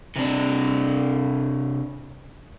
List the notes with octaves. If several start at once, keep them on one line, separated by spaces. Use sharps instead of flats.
C3 D4